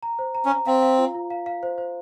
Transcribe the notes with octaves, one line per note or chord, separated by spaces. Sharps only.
A#5
C5
A#5
C#4
A#5
C4 F5
F5
F4
F4
F5
F5
C5
C5